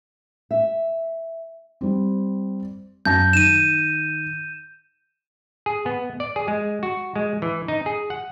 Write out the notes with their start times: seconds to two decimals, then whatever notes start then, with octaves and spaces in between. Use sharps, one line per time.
0.51 E5
1.81 G3 C4
3.05 F#2 A5 G6 A#6
3.33 D#3 D#7 E7
5.66 G#4
5.86 B3
6.20 D5
6.36 G#4
6.48 G#3
6.83 F#4
7.16 G#3
7.42 E3
7.68 D#4
7.86 G#4
8.10 F#5